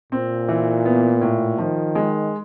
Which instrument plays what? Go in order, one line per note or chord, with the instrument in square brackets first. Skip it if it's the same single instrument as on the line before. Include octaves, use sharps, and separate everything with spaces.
[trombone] A#2 [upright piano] C4
[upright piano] E3
B3
A2
[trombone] D#3 [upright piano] F3
[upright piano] G#3